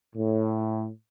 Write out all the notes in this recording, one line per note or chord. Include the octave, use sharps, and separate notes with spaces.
A2